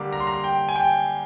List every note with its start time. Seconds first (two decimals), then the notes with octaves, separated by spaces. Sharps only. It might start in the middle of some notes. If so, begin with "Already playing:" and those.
Already playing: D3 G3 A#3 D6
0.13 A#5
0.20 C6
0.27 A#5
0.44 G5
0.69 G#5
0.76 G5